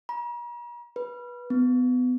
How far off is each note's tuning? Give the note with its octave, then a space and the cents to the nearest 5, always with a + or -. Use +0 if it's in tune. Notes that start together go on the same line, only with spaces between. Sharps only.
A#5 +45
B4 -20
B3 +25